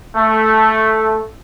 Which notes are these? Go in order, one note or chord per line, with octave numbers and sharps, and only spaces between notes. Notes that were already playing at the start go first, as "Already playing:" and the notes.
A3